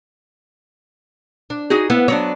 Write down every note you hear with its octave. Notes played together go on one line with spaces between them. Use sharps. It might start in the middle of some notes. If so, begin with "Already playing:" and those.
D4
D#4 F#4 G#4
B3 E4
F#3 B3 D4 C#5